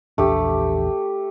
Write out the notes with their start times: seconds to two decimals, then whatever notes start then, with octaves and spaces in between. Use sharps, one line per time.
0.18 A#1 E2 A3 D4 G4